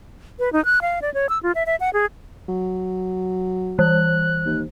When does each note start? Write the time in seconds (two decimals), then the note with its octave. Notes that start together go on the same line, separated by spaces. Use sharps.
0.39 B4
0.53 D#4
0.65 F#6
0.82 F5
1.02 D5
1.14 C#5
1.29 E6
1.43 F4
1.55 E5
1.66 E5
1.80 F#5
1.93 G#4
2.49 F#3
3.79 E3 F#6
4.46 D#2